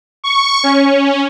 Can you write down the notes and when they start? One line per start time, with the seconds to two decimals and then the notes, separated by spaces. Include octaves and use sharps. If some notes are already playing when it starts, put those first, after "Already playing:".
0.24 C#6
0.63 C#4